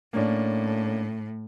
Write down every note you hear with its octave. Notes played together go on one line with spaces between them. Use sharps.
A2 A#3 C#4 D4